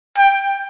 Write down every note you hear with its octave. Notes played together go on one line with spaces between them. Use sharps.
G5